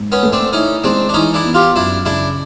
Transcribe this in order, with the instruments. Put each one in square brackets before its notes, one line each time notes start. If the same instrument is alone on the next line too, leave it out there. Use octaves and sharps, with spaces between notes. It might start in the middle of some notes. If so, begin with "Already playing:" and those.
Already playing: [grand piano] G#2
[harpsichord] B3 C#4
[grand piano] A3
[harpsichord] C4 D4
[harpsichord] C#4 D#4 [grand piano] E4
[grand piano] G#3 [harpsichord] C4 D4
[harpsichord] D4
[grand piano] E3 [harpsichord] C#4 D#4
[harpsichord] D4 E4
[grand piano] B3
[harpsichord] F4 G4
[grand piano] F#2 [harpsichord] D4 E4
[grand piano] C#3 [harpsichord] D4 E4